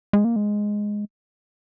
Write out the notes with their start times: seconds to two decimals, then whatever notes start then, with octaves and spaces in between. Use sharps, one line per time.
0.13 G#3
0.24 A#3
0.36 G#3